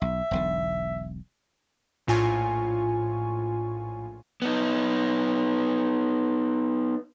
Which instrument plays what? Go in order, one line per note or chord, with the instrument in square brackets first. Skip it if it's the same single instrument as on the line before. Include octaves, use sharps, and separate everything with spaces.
[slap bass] B1 [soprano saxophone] E5
[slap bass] E1 B1 D3
[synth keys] A#1 A2 F4 G#5 C#6
[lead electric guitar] B3 D#4